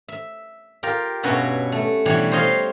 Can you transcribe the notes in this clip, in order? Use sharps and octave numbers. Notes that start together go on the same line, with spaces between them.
E5
F4 G4 A#4
G2 B2 C#4 F#4 B4 E5
A3
B2 E3 G3 D4 C#5
C5 C#5 D#5 F5 A5 C6